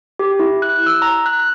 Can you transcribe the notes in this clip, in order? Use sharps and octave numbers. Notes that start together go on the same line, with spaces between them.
G4
E4
F#6
E6
A#5
F#6